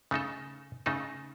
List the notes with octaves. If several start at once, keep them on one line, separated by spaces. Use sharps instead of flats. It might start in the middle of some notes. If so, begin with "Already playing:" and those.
C#3 A3 D#4 A4
C#3 A3 D#4 A4